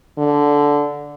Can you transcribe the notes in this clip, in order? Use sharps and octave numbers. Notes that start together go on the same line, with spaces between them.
D3